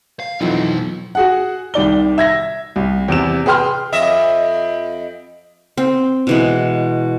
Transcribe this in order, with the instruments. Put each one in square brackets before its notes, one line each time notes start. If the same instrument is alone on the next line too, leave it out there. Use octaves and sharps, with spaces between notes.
[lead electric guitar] F5
[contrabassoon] F2 [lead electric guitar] B2 F#3 [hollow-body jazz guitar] E3 C4 D#4
[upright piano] F#4 G#4 F#5
C2 D#3 D5 G7
E5 G#6 A#6
C2
E2 C3 E7
G#4 B4 G5 C6 F6
[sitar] F2 D#5 E5
[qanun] C4
B2 E3 G#3